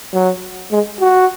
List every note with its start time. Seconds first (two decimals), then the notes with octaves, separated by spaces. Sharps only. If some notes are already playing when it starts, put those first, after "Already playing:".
0.13 F#3
0.71 G#3
1.00 F#4